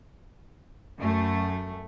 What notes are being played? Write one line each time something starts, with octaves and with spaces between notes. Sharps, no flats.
F#2 A3